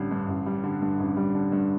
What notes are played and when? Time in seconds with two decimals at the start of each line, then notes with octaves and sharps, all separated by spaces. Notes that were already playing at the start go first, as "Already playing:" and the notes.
Already playing: A1 D3 G3
0.11 G2
0.28 A1
0.46 G3
0.63 D3
0.82 G2
1.00 A1
1.17 G3
1.34 D3
1.52 G2